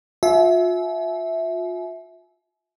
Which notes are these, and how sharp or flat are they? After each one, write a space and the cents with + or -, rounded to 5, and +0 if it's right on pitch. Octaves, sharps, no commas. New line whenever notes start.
F4 +35 E5 -10 G#5 +40